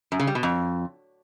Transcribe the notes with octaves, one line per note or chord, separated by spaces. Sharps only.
F#2
C#3
G3
B2
F2